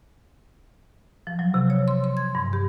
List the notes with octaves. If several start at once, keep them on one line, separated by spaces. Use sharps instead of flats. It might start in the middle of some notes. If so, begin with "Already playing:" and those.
F3
F#3
C3
C#5
C6
C6
G#6
G2
G4